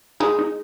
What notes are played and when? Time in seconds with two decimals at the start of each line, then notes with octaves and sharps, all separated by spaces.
0.20 G#3 D#4
0.39 D#4